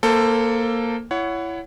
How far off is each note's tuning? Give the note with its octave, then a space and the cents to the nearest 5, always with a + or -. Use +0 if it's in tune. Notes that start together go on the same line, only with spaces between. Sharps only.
A#3 +0 A4 +15 C5 +0
E4 +20 C#5 +20 F#5 +0